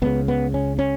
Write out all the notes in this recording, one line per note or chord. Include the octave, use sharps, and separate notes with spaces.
C#2 C#3 B3
B3
C#4
C#4